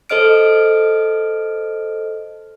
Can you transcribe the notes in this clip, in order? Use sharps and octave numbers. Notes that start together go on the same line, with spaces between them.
A4 C5 D#5 F6 D7